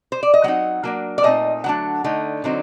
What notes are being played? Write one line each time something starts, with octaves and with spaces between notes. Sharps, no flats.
C5
D5
D#5
F#3 C4 D#4 F#5
F#3 A#3 D4
D5
A#2 A3 C4 D#4 D#5
D3 F#3 A3 D4 F#5
D3 A3 D#4
D3 F#3 C4 D#4